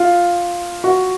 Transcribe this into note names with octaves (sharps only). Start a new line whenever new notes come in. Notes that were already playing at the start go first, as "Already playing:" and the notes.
Already playing: F4
F#4